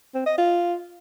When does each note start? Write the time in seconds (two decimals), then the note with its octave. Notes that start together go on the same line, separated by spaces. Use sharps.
0.15 C4
0.26 D#5
0.38 F4